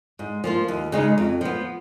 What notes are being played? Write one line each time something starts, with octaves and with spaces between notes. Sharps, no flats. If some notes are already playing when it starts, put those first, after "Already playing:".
G#2
F3 A#3 F4
D#2
C#3 G#3 D#4
F2
F3 B3